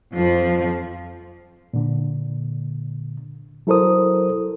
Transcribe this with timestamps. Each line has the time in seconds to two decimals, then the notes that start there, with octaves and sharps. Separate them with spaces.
0.14 F2 F3
1.74 A#2 D3
3.67 F#3 E4 A4 A#4 C5 D#6